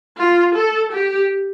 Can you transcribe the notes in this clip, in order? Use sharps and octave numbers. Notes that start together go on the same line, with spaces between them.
F4
A4
G4